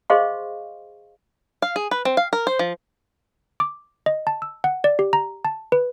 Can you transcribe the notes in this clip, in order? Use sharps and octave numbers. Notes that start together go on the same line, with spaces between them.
G#4 C5 D#5 F5 C6 C#6
F5
G#4
B4
C4
F5
A#4
C5
F3
D6
D#5
A5
E6
F#5
D5
G4
A#5
A5
B4